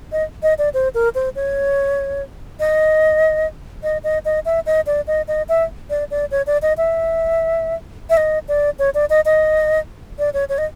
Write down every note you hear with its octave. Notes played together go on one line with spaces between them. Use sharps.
D#5
D#5
D5
C5
A#4
C5
C#5
D#5
D#5
D#5
D#5
E5
D#5
D5
D#5
D#5
E5
D5
D5
C#5
D5
D#5
E5
E5
D#5
D5
C#5
D5
D#5
D#5
D5
C#5
C#5
D#5